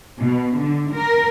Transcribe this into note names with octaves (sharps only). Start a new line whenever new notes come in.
B2
D3
A#4